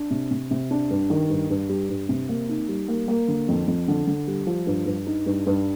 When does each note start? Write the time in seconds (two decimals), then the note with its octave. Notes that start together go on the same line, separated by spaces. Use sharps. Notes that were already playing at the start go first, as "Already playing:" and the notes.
Already playing: D4
0.10 C3
0.31 C3
0.51 C3
0.71 D4
0.90 G2
1.10 D#3
1.30 G2
1.50 G2
1.69 G3
1.89 G2
2.09 C3
2.29 A#3
2.49 D#4
2.68 G3
2.88 A#3
3.08 A#3
3.28 D3
3.48 F2
3.68 F2
3.88 D3
4.07 D3
4.27 G3
4.47 F3
4.67 G2
4.86 G2
5.07 D#4
5.26 G2
5.46 G2